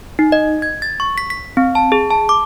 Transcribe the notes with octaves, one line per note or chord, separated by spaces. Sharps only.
D#4
D#5
G#6
A6
C#6
B6
B6
C4
A5
G#4
A5
D6